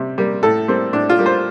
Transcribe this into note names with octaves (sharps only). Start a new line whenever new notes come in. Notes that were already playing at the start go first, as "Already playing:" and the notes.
Already playing: C3 G3
G3 A#3
A2 A4
G3 A#3 C4
A2 D4
F4
G3 A#3
C5